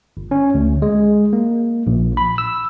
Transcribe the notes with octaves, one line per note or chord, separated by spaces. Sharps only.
G1
C#4
D2
G#3
A#3
A#1
B5
E6